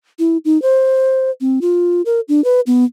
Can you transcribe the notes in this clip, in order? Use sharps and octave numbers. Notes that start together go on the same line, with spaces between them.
E4
D#4
C5
C4
F4
A#4
D4
B4
B3